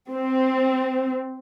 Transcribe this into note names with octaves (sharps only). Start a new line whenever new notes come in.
C4